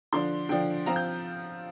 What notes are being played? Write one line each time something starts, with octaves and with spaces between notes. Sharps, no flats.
D3 F3 D4 C6
D3 F3 D4 G5
F3 C4 F4 A#5
G6